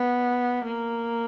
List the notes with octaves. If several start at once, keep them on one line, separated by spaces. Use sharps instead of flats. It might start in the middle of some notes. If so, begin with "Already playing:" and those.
Already playing: B3
A#3